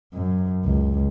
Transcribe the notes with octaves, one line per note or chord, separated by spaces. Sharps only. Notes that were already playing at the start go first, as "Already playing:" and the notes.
F#2
C#2